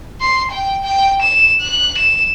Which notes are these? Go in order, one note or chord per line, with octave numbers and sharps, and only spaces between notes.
C6
G5
G5
E7
F#6
E7